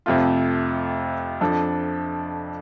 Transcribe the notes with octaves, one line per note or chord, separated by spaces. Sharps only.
F2 C3 A3 F4
F2 F3 D4 A4